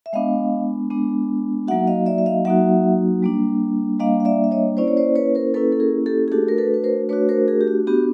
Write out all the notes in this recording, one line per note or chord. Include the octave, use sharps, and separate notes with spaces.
E5
G#3 B3 D4 D#5 F5
G#3 B3 D4
F#3 A#3 D#4 F#4 E5 F#5
D#5 F5
D5 E5
E5
D#5 F5
F#3 A#3 D#4 F#4 E5 F#5
G3 A#3 D4
G3 A#3 D4 D#5 F5
F5
D5 E5
E5
C#5 D#5
A#3 C#4 E4 C5 D5
C#5
C5 D5
B4 C#5
A#4 C5
A#3 C#4 E4 A4 B4
A4
G#4 A#4
G4 A4
G#4
A3 D4 F#4 G4 A4
A#4
A4 B4
B4
A#4 C5
A3 D4 F#4 B4 C#5
A#4 C5
G#4 A#4
G4
F#4
B3 D4 F#4 G4